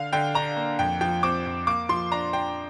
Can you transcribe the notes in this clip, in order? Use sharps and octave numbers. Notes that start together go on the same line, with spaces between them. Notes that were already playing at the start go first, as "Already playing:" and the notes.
Already playing: D3 F5
D3 G5
D4 A#5
A#3
F2 G5
F3 G5
C4 D6
F2
A#3 D6
F3 C6
D4 A#5
D4 G5